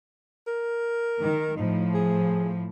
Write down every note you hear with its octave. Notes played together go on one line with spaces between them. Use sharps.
A#4
D#3
A2 F3 D#4
G#4